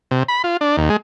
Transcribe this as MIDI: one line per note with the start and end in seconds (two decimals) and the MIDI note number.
0.11 0.23 48
0.28 0.42 83
0.44 0.57 65
0.61 0.76 62
0.77 0.89 39
0.90 0.97 56